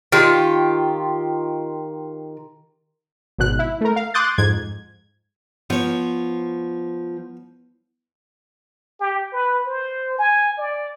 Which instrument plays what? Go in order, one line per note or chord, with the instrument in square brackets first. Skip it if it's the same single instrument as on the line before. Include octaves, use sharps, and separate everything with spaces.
[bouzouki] D#3 F4 G4
[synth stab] G#1 B2 F#6
E4
A3 A#4
F5
C6 D6 D#6 F#6 G6 A6
F2 G#2 G#6
[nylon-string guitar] F3 [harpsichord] B3 C#5
[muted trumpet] G4
B4
C5
G#5
D5